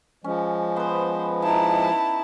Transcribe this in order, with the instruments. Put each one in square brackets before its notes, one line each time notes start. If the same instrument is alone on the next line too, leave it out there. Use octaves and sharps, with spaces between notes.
[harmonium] F3 G#3 [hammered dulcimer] C#4
[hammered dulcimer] B3 B4 [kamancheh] C5
[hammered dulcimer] D#4 [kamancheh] E4 A5